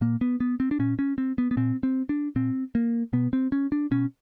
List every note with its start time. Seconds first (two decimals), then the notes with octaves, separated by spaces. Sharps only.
0.01 A#2 A#3
0.21 B3
0.40 B3
0.60 C4
0.71 D4
0.79 A#2 C#4
0.99 C#4
1.18 C4
1.38 B3
1.51 B3
1.57 A#2 C4
1.83 C4
2.09 D4
2.36 A#2 C4
2.75 A#3
3.13 B2 B3
3.33 C4
3.52 C#4
3.72 D4
3.91 B2 C#4